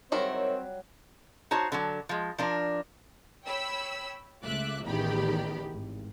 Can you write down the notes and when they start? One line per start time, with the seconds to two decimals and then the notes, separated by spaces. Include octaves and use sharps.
0.12 D#3 F#3 G3 C4 E4 F#4 A#4 C#5
1.51 D#4 F#4 C5 C#5 A5
1.72 D3 F#3 A5
2.09 F3 G#3
2.38 F3 D4 A#4
3.44 C#5 G5 B5 E6
4.42 C#2 A3 F4 E5 D6 F#6
4.85 A1 E2 D#3 D#4 G4 B5
5.70 G#1